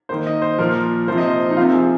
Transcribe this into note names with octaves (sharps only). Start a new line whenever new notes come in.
D#3 A#3 C5
D#5
C5
A#2 F3 A#3 A#4
C3 F3 A#3 C5
D#5
C5
D#4
C3 F3 C4 F4
G#4